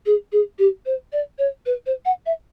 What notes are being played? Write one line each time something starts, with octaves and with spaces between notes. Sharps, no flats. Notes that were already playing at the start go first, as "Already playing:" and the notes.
G#4
G#4
G4
C5
D5
C#5
B4
C5
F#5
E5